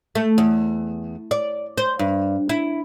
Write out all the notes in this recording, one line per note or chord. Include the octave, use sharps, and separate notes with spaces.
A3
E2
D5
C5
G2
E4